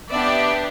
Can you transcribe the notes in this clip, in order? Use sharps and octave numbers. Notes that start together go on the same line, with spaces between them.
B3 D4 G4 D5 E5